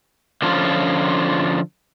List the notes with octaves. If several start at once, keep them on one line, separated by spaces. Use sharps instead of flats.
D3 F3 C#4 F4